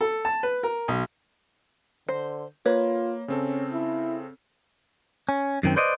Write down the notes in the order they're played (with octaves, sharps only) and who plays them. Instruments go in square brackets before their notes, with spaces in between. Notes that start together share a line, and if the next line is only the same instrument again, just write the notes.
[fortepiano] A4
A5
B4
A#4
B1
[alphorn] D3 [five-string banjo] C5
[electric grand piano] A#3 [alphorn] F4 [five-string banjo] B4 [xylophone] C#5
[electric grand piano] C#3 C4 A4 [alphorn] C#4
[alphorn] E4
[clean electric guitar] C#4
F#2 D#3 C4
B4 C5 D5 D#5